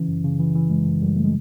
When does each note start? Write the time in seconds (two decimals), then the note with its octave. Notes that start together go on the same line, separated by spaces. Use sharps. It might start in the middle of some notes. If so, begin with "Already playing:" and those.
Already playing: C#3 E3 C#4
0.08 F#2
0.24 C#3
0.39 E3
0.55 E3
0.70 F#2 G#3
0.86 F#2
1.02 F#2 G3
1.16 C#3 A3
1.25 G#3